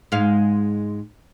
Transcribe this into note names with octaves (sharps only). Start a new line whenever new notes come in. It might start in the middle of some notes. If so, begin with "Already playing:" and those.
G#2 G#3 F5